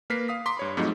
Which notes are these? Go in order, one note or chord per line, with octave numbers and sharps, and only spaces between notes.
A#3 A#4 B4 B6 C7
F5 D#6 B6
A#5 C6 D6 B6
G2 C#5 B5
F2 G#2 F#3 A3 D#4